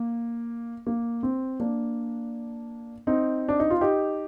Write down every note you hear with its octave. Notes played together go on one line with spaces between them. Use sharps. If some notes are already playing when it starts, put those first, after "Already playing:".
Already playing: A#3
A#3
C4
A#3 D4
C4 D#4
D4
D#4
F4
D#4 G4